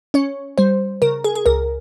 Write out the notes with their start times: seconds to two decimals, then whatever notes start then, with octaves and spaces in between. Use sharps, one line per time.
0.14 C#4 C#5
0.58 G3 C5
1.02 C#3 A#4
1.24 G#4
1.35 G#4
1.46 C#2 A#4